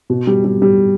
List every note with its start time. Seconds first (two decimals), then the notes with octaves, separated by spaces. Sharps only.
0.10 B2
0.27 G3
0.44 G3
0.62 G3